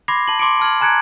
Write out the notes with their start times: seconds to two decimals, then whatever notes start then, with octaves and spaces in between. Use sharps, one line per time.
0.08 B5 C6 D6 G#6 A#6 C7
0.28 A5 F#7
0.39 C6 D6 C#7 D7
0.60 A5 F6 G#6 F#7
0.81 G#5 A#5 F#6 G#6 C#7 D7